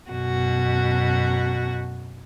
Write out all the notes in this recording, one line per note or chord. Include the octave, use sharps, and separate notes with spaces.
F#2 B2 F#4